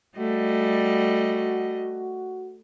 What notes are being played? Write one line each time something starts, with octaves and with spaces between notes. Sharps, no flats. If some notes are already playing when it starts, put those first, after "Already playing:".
G3 A3 F#4 D#5